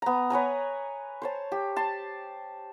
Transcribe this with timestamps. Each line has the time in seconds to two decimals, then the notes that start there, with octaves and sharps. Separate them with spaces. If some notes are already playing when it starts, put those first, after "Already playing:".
0.02 B3 A#5
0.30 B4 C#5 G#5 A#5
1.22 C5 C#5 A5
1.52 G4
1.76 A5 C6